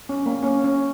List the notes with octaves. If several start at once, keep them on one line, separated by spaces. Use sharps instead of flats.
C#4
A#3
C#4
C#4